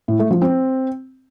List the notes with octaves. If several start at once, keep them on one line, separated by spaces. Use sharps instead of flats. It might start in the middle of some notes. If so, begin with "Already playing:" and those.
A2
A3
F3
C4